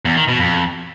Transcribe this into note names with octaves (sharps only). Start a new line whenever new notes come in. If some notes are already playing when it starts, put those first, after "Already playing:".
E2
D#3
B2
F2